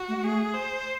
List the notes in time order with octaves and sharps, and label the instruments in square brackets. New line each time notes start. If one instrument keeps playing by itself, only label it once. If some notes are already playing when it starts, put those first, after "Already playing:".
Already playing: [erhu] F#4
[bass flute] A3
[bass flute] A3 [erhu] G#4
[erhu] C5